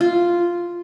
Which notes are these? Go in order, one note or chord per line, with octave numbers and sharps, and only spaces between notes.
F4